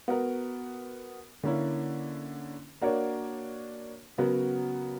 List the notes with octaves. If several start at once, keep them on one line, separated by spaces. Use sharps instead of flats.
B3 F#4 A#4
D3 A#3 C#4 E4
A#3 D4 F#4 A#4 C#5
C#3 F#3 B3 F#4 A#4